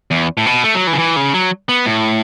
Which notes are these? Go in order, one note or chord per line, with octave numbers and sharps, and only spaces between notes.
E2
A2
B2
A3
F#3
E3
C#3
E3
C#3
F#3
B3
A2